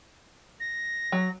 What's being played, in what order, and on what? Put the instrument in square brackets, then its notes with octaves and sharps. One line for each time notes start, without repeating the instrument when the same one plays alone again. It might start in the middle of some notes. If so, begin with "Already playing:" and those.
[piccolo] A#6
[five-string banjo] F#3